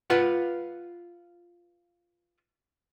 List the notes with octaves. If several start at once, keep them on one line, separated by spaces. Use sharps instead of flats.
F4 B4 F#5